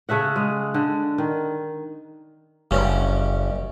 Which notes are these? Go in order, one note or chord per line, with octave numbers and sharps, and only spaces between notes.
C#3 A3 E5 F#5
G#3
D3
D#3
F#1 G2 C#4